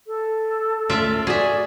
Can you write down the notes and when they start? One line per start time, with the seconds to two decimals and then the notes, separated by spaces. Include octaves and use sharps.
0.07 A4
0.89 D2 A3 C#4 F4 D5 E5
1.27 F#4 G#4 D5 E5